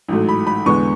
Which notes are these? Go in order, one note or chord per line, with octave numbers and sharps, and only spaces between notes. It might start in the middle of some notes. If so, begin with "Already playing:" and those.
A1 G#2 F#3 A3
B5
B5
E2 D3 G#3 B3 C#6